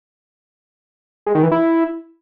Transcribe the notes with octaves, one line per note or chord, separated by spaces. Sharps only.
G#3
D#3
E3
E4